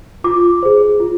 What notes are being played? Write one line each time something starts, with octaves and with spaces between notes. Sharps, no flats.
F4 D6
G#4 C5
F4